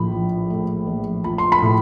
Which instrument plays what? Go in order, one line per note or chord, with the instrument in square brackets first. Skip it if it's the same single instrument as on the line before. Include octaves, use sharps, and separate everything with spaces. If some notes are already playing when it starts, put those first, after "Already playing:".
Already playing: [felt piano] A#1 A2 F3 B5
F3
A3
A#1
F3 B5
C6
B5
A2